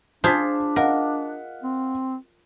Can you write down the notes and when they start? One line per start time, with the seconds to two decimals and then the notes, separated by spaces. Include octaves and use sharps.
0.24 D4 F4 G#4 C5 A5 B6
0.76 A#4 D#5 F5 F#5
1.64 C4